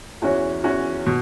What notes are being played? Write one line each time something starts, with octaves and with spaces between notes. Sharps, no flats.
E2 E3 C#4 F#4 C#5
E2 E3 C#4 F#4 C#5
B2